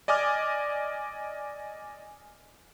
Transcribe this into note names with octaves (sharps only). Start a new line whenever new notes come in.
D5 D#5 G#5 D6 F6